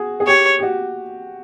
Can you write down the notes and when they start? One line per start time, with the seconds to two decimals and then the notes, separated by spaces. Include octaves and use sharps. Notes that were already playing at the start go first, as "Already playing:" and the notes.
Already playing: F#4 G#4
0.20 G#4
0.27 G4 C#5
0.59 G4
0.63 F#4